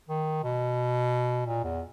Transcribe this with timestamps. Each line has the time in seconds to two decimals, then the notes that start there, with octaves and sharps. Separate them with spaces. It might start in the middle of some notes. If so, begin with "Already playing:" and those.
0.09 D#3
0.43 B2
1.47 A#2
1.64 E2